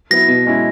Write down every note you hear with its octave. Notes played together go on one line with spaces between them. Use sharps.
F#3 B3 E4 A#6
B2
G#3 C#4 E4